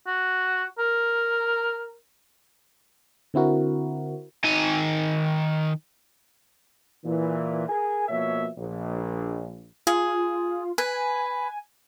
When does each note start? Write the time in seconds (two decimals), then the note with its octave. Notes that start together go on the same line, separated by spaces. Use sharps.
0.07 F#4
0.79 A#4
3.34 D3 C4 E4 F#4 A#4
4.44 D#3 G#5
7.04 A#2 E3
7.69 G#4 A#4 G#5
8.08 B2 F3 A#3 C#5 E5
8.57 A#1
9.87 F4 G#4
10.78 B4 G#5